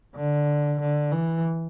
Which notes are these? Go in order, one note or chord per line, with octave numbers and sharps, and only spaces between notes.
D3
D3
E3